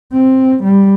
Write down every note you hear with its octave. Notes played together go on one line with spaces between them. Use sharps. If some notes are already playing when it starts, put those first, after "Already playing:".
C4
G3